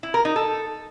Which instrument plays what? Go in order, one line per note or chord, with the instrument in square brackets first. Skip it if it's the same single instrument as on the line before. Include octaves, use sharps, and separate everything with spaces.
[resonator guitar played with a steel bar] E4
A#4
D#4
A4